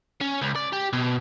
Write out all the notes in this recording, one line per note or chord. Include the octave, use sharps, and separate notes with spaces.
C#4
C#2
D5
G4
B2